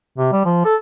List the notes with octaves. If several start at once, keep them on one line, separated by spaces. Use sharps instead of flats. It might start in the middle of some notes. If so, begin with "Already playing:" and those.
C3
G3
F3
A4